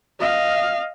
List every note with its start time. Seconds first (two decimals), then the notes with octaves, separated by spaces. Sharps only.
0.20 D#5 F5